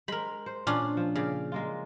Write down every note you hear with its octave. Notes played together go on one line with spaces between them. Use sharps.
G#3 A#4 C5 B5
C5
A#2 C#4 D4 F4
F3
C#3 D5 F5
G#3 A#3 F4